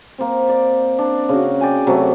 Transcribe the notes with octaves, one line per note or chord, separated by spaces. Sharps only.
A#3 C4
D5
D4
C#3 F#4
D5 G5 G#5
C3 F#3 A3